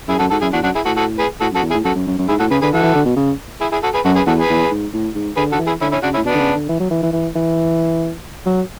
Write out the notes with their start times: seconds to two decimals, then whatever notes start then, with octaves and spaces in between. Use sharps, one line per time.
0.08 F#2 E4 G#4
0.19 F#2 F#4 A4
0.31 G#2 F#4 A4
0.41 F#2 E4 G#4
0.53 E2 D4 F#4
0.63 F#2 D4 F#4
0.75 E4 G#4
0.85 A2 F#4 A4
0.97 F#4 A4
1.19 G#4 B4
1.40 A2 F#4 A4
1.51 F#2
1.55 F#4 A4
1.63 E2
1.70 E4 G#4
1.74 A2
1.85 F#2 F#4 A4
1.95 F#2
2.07 F#2
2.18 F#2
2.29 G#2 E4 G#4
2.40 A2 F#4 A4
2.51 C#3 G#4 B4
2.62 D3 G#4 B4
2.73 E3 F#4 A4
2.83 E3
2.95 D3
3.05 B2
3.16 C#3
3.61 E4 G#4
3.72 E4 G#4
3.83 F#4 A4
3.94 G#4 B4
4.05 F#2 F#4 A4
4.16 G#4 B4
4.26 E2 F#4 A4
4.38 G#4 B4
4.50 E2
4.71 G#2
4.93 A2
5.15 G#2
5.37 D3 G#4 B4
5.52 D3 F#4 A4
5.59 E3
5.66 E4 G#4
5.81 D3 C#4 E4
5.92 C#4 E4
6.03 C#3 D4 F#4
6.14 C#4 E4
6.17 A2
6.25 B2 B3 D4
6.34 D3
6.40 C#3
6.55 D3
6.69 E3
6.80 F#3
6.91 E3
7.03 E3
7.13 E3
7.36 E3
8.46 F#3